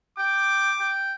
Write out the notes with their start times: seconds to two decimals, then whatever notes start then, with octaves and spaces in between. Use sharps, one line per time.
0.18 G5 D6
0.80 G5